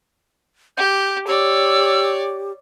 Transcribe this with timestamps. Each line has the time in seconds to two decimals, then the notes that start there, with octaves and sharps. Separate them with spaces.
0.77 G4 G6
1.27 G4 C#5 D5 E6